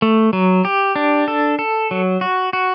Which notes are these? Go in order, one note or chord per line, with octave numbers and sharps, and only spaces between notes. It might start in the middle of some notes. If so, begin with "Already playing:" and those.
A3
F#3
G4
D4
A4
A4
F#3
F#4
F#4